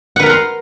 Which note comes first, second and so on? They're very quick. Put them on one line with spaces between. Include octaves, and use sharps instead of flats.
F#5 B4 A#4 A#5 C6